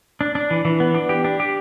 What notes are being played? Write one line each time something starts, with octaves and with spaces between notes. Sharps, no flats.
D4
D4
E3
E3
B3
D4
G4
D4
G4